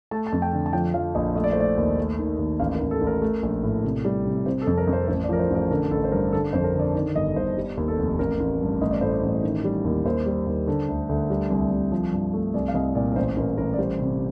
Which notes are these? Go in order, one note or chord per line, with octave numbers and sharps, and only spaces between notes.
A3 A5
A5
F2
G5
D3
A5
F3 G5
F3 F5
A#1 D#5
A3 D#5
D5
C5
A3 D5
D#2
A3
D#3
D#2
A1 F5
A#4
A1
A4
A1
A#4
A3
A#1
A2
C3
G3
C3
C3 C5
A4
F2
A#4
F2
C5
A1 C5
D5
F3 A#4
C5
A1
A#4
D3 A#4
A1 A4
C5
G2 A#4
D3 A4
F2 C5
A#4
D3
D5
D#3 D5
G1 D#5
G1 C5
G3
D#2
A4
F1
A1 A#4
A1
G2
A1 D#5
D5
A2 C5
D5
A1
D#3
G3
D#2
D#2 C5
G3
D#2
D3
D2
D2
G3
C2
C2
F3
G2
A3
C2 D5
F5
C2 D#5
A#2 D5
A#4
A1 C5
A1 A#4
A1 A#4
D5
G3 C5
C3